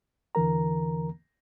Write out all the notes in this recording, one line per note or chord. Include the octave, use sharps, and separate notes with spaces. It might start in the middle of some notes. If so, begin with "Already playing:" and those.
E2 D3 E3 A#4 A#5